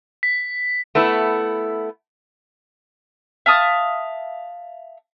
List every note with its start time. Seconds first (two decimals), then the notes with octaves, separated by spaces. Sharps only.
0.23 B6
0.95 A3 B3 E4
3.46 E5 F5 A5 D#6